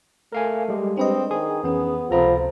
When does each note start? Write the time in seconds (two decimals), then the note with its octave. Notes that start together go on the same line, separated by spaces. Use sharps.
0.32 A3 A#4 F5 G#5
0.68 G3 G#3 G4
0.97 C4 D4 B4 D#5
1.31 D#3 G#4
1.63 F2 E3 B3 C#4
2.11 C#2 C3 F3 A4 A#5 B5